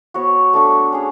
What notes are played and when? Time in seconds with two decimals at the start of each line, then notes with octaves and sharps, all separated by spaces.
0.14 B3 F#4 C#5
0.53 A3 D4 A4
0.93 C#4 G#4